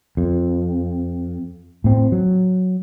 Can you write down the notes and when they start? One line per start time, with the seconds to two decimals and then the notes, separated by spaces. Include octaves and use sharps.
0.17 F2
1.84 A2 C4
2.12 F#3